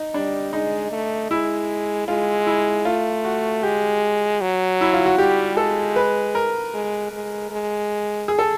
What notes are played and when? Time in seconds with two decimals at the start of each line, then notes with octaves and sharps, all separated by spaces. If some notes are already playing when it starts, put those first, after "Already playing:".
Already playing: D#4
0.14 G3 D4
0.52 G#3 D#4
0.92 A3
1.30 G#3 E4
2.08 G#3 F4
2.47 E4
2.85 A3 F4
3.25 F#4
3.63 G#3 G4
4.41 F#3
4.81 E4
4.93 F4
5.06 F#4
5.18 G3 G4
5.57 G#3 A4
5.96 B4
6.35 A#4
6.74 G#3
7.12 G#3
7.51 G#3
8.28 G#4
8.39 A4